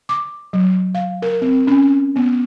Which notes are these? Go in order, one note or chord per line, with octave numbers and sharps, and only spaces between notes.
D6
F#3
F5
A#4
C4
C#4
B3